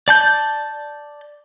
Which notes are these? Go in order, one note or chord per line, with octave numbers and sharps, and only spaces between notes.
D5 A5 G6